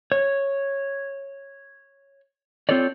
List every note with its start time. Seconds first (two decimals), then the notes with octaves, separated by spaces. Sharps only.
0.12 C#5
2.69 C4 F4 A4 C#5 D5